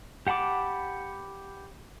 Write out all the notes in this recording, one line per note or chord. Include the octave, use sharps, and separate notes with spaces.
G4 F#5 A5 B5 D6